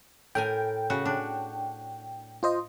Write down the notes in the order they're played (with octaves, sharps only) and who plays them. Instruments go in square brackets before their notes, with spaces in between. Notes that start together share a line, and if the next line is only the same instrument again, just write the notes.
[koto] A2 A#4 G#5 [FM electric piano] G5
[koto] C#3 F#4
D4
[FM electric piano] F4 C5 D#5